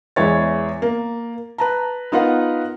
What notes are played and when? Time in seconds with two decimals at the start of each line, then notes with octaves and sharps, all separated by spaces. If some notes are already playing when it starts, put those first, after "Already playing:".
0.16 E2 E3 G#3 E4 C#5 A6
0.82 A#3
1.58 B4 A5 A#5
2.12 B3 D#4 F4 A#4 B4 F#5